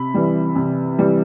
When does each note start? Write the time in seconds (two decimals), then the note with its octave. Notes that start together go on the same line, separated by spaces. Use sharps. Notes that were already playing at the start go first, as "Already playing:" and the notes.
Already playing: C3 B5
0.14 E3 G3
0.56 C3
0.98 E3 G3